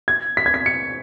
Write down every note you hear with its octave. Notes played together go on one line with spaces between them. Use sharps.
G#6
B6
G#6
B6
C#7